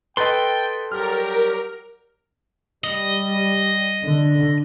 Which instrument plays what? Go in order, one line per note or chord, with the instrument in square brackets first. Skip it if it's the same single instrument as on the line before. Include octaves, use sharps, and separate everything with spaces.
[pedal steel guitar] A4 C6 [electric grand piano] B4 D#5 [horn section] G5
[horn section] F#3 G3 G4 [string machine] A#4 [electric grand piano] F6
[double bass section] G3 [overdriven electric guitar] D#5
[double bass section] D3